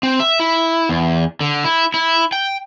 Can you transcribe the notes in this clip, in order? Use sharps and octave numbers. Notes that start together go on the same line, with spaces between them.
C4
E5
E4
E2
D3
E4
E4
G5